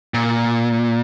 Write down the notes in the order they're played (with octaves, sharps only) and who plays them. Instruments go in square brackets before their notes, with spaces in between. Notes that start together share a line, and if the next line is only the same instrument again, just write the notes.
[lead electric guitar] A#2